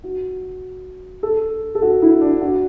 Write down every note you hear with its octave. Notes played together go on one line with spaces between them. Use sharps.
F#4
A4
A4
F#4
E4
D4
F#4